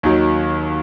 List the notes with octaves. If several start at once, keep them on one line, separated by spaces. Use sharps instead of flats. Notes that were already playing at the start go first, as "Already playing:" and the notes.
D#2 D#3 F#3